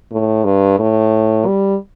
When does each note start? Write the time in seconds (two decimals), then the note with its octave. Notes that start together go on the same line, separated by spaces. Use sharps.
0.12 A2
0.45 G2
0.79 A2
1.46 G3